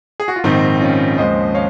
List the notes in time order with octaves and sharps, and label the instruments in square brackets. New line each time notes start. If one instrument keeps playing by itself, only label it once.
[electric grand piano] G#4
F#4
F4
A#1 G#2 D#3 C4 D#4
C#4 F4
D#2 C#3 F3 G#3 C5 D#5
C#5 F5